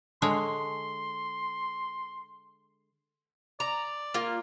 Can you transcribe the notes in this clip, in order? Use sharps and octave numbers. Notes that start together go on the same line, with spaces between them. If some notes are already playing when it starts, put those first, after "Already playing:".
D3 G#3 C#5 C6
D5 A#5
A#3 F4